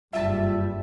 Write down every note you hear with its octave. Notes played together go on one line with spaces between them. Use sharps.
F#1 G2 G3 F4 E5 A5